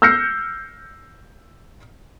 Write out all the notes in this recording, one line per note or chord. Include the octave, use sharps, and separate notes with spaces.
E6 F6 G6 A#6 C7 C#7